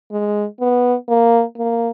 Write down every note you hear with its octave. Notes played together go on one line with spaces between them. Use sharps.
G#3
B3
A#3
A#3